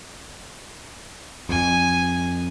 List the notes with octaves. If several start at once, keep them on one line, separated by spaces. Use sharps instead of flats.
F2 G#5